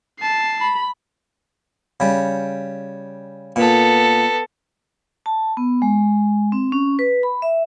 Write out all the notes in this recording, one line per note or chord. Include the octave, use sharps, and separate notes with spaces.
A5 C7
B5
C#3 G3
A#2 B3 A4
A5
B3
G#3
C4
C#4
B4
B5
E5